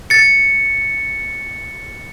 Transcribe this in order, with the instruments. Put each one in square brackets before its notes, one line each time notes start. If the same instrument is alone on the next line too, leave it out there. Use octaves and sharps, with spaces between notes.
[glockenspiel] A6 C#7